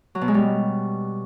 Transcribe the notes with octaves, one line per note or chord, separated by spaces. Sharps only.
F#3
B2
G#3
G3